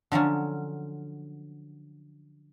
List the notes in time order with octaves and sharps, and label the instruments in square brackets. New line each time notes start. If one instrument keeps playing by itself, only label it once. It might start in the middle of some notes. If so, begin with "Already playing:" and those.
[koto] D3 F3 F#3 C#4